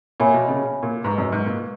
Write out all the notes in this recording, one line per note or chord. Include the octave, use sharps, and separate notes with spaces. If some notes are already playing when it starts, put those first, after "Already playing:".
A#2 C#5 E5 G#5 B5
B2
C#3
A#2
G#2 B4 D#5 A#5 C#6
F#2
G#2
A#2